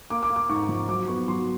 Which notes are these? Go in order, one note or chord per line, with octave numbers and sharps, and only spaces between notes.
A#3 D6
D6
A#3
D6
G#2 C#6
F3
F#3 D6
B3 C#6
F#3 C6